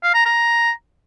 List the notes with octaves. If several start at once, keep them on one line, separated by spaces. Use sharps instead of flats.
F5
A#5
A#5